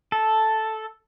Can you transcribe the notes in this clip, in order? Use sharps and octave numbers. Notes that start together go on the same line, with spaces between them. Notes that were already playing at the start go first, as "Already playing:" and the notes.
A4